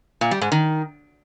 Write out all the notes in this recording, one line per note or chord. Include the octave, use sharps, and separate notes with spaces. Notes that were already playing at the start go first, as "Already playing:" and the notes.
A#2
G3
G#2
D#3